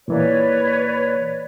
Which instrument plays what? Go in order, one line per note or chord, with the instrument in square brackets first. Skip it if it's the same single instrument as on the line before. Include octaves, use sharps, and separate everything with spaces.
[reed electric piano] A#2 E3 A#3 [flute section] B4 C#5 D5